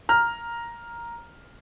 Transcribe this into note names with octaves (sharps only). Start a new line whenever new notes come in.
A#5 F6